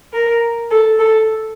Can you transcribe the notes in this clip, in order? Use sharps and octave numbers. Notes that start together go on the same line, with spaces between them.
A#4
A4
A4